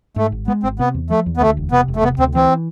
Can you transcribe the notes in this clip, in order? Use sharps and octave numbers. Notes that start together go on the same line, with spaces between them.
G#2 A3
G#1
G#3 B3
G#1 C4
C3 B3
E2
F3 A3
E2
B3
D2 A3
E1
C3 B3
E1
A3
C3 B3
D2 C4
E3 C4